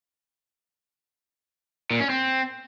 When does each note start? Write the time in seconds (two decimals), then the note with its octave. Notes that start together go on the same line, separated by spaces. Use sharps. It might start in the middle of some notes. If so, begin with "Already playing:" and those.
1.91 A#2
2.00 C#4
2.10 C4